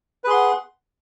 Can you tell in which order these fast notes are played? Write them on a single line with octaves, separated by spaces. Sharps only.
B4 G#4 C6 F#5